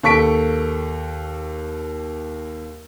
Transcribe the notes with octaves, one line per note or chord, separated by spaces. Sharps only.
D#2 A4 C#6 B6 D7